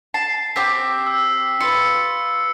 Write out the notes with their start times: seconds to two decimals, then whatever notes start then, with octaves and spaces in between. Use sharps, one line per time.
0.14 A5 C7
0.56 C4 G4 B6
1.07 E6
1.60 F4 B4 C#7